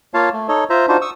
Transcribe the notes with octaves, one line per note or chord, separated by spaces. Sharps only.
A#3 F4 C#5 F5 A5
A3
D#4 A4 C#5 D#5
F4 C5 E5 A#5
D4 D#4 F4 F#4 C5
C#6 D#6 E6